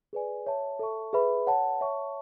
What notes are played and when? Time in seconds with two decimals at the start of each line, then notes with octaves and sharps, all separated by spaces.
0.13 G#4 B4 D5 G#5
0.47 C#5 E5 A5
0.79 A4 E5 A5 C#6
1.13 G#4 B4 E5 B5
1.47 C#5 F#5 A5
1.81 C#5 E5 A5 C#6